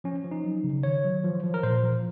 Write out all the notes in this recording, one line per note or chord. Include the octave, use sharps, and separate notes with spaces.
F3 C#4
F3
D#4
F#3
C#3
D#3 C#5
F#3
F3
F3
A#4
A#2 C5
F3